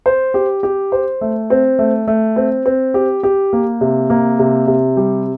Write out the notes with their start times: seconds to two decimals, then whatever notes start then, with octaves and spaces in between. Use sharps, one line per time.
0.06 C5
0.34 G4
0.63 G4
0.92 C5
1.21 A3
1.50 C4
1.79 A3
2.07 A3
2.36 C4
2.66 C4
2.94 G4
3.23 G4
3.53 A#3
3.81 C3
4.10 A#3
4.39 C3
4.67 C3
4.97 G3